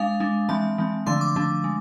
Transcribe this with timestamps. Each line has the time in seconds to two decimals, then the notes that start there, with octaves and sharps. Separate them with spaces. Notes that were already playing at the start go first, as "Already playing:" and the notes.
Already playing: G#3 D4 F5
0.20 G#3 D4
0.49 E3 G#3 C4 A5
0.78 E3 G#3 C4
1.06 D3 F3 A3 D4 C6
1.21 D6
1.36 D3 F3 A3 D4
1.64 G#3